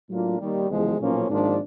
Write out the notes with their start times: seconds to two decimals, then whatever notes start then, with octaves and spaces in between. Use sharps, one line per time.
0.10 A2 F#3 A#3 D4 F4
0.40 D#2 D#3 G3
0.69 F#1 E2 C3 F3 G#3
0.99 B1 A#2 F3 A#3 C#4
1.29 G#1 G#2 F3 A#3 D4